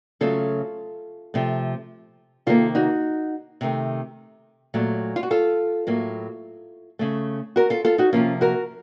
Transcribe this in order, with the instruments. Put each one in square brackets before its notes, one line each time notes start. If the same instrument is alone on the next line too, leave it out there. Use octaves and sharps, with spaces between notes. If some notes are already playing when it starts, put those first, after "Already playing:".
[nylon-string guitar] C#3 F#3 A3 F4 A4
C3 F3 A3
C3 D#3 A#3 F4 A4
D#4 F#4
C3 D#3 A3
A#2 F#3 A3
F4
F#4
F4 A4
A2 F#3 A#3
C#3 A3
F#4 A#4
F4 A4
F4 A4
D#4 F#4
C3 F3 A#3 C#4 F4
F#4 A#4